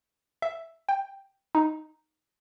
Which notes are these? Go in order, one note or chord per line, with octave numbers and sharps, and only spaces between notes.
E5
G5
D#4